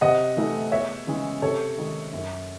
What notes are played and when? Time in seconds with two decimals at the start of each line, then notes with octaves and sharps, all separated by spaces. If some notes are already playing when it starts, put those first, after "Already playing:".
0.01 C3 D#5 F#5
0.37 E3 A3 D#4
0.72 E2 C#5 E5
1.07 C#3 E3 G#3 C#4
1.42 C3 A4 C#5
1.78 D#3 G#3 D#4
2.12 F#2